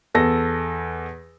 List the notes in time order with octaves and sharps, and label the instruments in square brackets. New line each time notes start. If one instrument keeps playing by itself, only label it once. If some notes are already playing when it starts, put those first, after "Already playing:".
[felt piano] E2 A4 A#6